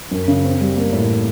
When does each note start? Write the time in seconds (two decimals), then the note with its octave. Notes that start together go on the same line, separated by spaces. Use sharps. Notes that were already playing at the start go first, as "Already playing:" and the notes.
0.11 F#2
0.28 C#3
0.44 C4
0.61 G3
0.76 A#3
0.93 A2